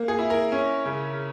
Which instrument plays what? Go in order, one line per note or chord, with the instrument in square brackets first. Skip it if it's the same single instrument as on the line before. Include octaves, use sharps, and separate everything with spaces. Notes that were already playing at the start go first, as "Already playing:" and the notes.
Already playing: [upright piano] A#3
G#4
E4
A#4
C#4
C#3